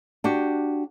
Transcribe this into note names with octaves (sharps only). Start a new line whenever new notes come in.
D4 F#4 G4